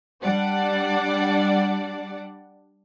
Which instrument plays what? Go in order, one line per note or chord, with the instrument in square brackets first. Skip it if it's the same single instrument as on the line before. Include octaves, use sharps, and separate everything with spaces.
[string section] G3 D4 D5 F#5